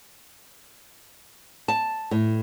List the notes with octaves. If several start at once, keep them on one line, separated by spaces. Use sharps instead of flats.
A5
A2